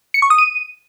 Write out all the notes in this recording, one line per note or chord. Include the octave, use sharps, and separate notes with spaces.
C#7
C#6
D#6
D#7